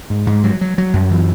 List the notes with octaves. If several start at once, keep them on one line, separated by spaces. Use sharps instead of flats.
G#2
G#2
F#3
F#3
F#3
F#2
E3